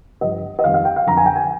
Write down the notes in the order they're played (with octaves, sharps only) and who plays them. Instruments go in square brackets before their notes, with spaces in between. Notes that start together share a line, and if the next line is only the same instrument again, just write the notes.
[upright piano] G2 F3 D#5
D#5
F2 D#3 G3 F5
F5
G5
F5
F2 D3 F3 A#5
G#5
G5
G#5